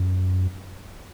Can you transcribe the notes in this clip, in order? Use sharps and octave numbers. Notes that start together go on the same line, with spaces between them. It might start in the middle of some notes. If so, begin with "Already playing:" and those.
Already playing: F#2